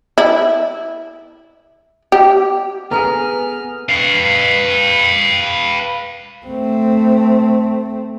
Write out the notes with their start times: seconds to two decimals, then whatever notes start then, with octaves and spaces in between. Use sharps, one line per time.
0.18 E4
2.12 G4
2.91 B3 G#4 A4 B4 G#5 A#5 F6
3.89 B4 F5
6.46 A3 C4